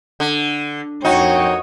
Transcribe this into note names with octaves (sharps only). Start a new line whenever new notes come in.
D3
F2 A#3 D#4 F#4 C#5 G5